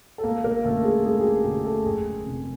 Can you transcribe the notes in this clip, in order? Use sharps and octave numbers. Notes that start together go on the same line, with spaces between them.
A4
G#1 A#3 A#4
A#3 A#4
F#2 D3 A3 A4
G#3 G#4
G#1 G#3 G#4
G#4
G4
F#2 D3 G4
A3 A4
F#1 G#3 G#4
F2 C3